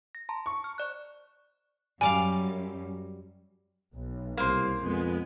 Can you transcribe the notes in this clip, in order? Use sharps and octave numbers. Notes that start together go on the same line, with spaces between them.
A#6
A5 A#5 C6
C#6
F6
C5 D5 F#6
F#2 G3 D5 F5 G#5
B1
C2 A#3 C5
F2 G#3 B3